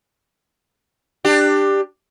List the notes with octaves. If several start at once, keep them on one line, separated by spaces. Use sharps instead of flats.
D4 G4